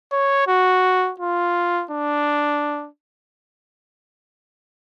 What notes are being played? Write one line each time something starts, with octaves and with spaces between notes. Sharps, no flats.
C#5
F#4
F4
D4